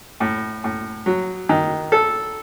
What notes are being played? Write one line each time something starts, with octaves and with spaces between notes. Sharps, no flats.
A2
A2
F#3
D#3
A4